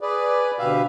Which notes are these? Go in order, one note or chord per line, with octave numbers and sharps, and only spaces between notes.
G#4 B4 D5
D2 B2 G4 B4 E5 F5